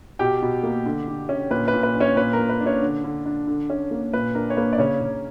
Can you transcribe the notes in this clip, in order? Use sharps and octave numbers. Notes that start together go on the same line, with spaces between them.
B2 G4 G5
B2
A#3
D3
D3
C#4
A#2 B4
B4
A#2
B4
D4
C#4 C#5
A#2 B4
A#4
A#2
B4
D4
C#4 C#5
D3
D3
D4
D3
C#4
A#3
A#2 B4
D4 A#4
C#5
A#3 B4
D5
C#3 C#4 C#5
C#3